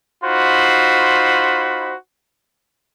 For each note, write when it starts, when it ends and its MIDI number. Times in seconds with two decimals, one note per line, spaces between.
0.24 1.95 63
0.24 1.95 65
0.24 1.95 66
0.24 1.95 72
0.24 1.95 83